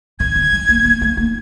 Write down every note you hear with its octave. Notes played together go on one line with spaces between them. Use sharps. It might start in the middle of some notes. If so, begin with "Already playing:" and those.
D#3 G#6
D3
G#3
A#3
A#3
A3
A#3